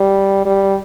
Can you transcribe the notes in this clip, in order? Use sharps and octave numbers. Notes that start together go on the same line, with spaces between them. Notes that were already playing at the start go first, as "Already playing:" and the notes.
Already playing: G3
G3